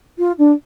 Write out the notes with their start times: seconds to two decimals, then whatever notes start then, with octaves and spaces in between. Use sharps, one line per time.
0.19 F4
0.39 D4